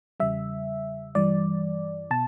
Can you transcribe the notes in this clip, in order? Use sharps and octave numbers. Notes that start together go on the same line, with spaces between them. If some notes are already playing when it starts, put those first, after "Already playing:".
E2 C#3 G3 E5
G2 E3 G3 D5
B2 A5